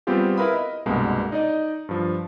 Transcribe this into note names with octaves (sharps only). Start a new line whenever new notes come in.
G3 B3 C4 F4 G4 G#4
E4 A#4 B4 F5 B5 D#6
D#5
C2 G2 B2 G#3 A#3
D#4 D5 D#5
G2 F3